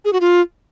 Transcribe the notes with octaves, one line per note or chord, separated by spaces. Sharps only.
G#4
F#4
F4